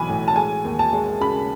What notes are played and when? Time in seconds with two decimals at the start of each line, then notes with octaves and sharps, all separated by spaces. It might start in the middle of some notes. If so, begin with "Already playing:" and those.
Already playing: B1 E3 G#5 B5
0.09 A2
0.28 A5
0.36 G#3 G#5
0.65 D#2
0.79 A5
0.93 G#3
1.21 C#3 B5